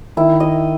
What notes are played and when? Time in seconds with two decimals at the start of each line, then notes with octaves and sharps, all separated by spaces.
0.17 D#3 E4
0.40 D#5